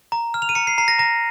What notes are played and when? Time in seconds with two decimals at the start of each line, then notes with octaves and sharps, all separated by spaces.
0.12 A#5
0.34 F6
0.42 F7
0.49 D#7
0.55 A#5 C#7
0.67 C7
0.78 A#5 C7
0.88 A#6
0.99 A#5 A#6